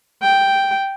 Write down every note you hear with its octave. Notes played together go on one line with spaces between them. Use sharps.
G5